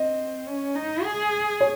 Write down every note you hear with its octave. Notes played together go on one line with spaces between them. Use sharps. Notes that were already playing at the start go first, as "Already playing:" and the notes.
Already playing: C4 D#5
C#4
D#4
G#4
C#5